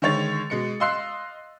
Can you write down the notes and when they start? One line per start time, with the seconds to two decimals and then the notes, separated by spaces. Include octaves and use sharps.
0.02 D3 D#3 G#3 C#5 A6 F7
0.50 B2 G#3 C#7
0.80 D#5 F5 C6 E6 F#6 C7